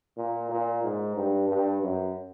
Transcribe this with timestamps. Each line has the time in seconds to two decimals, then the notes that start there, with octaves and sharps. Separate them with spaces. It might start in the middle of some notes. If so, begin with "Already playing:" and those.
0.17 A#2
0.50 A#2
0.83 G#2
1.16 G2
1.49 G2
1.82 F#2